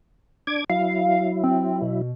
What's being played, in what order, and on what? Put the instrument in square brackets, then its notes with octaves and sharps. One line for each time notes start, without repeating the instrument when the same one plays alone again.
[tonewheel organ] D4 D6 G#6
[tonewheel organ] F#3 E4 [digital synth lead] F5
[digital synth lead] C4
B2